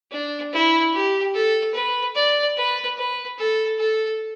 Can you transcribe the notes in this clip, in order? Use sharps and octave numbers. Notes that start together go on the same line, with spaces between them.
D4
E4
G4
A4
B4
D5
B4
B4
A4
A4